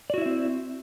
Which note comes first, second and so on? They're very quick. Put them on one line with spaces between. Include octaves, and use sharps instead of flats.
D5 F#4 E4 E5 C4